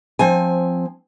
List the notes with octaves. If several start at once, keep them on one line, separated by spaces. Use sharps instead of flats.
F3 C4 G#5